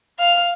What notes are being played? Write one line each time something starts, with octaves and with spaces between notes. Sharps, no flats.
F5